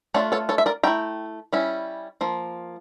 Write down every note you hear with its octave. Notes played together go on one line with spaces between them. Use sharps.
A3 D4 F4 A4 C#5
A4 C#5
A4 C#5
E5
A#4 D5
A3 E4 G5 A#5
G3 C#4 E4
F3 A#3